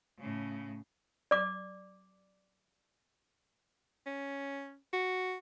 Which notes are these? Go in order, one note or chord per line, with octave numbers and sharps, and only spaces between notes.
A2 C#3
D5 D6
C#4
F#4